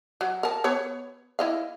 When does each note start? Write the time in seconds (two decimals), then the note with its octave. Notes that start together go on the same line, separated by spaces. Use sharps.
0.21 F#3
0.43 A#4 A5
0.64 B3 C#5
1.39 E4 D#5 F5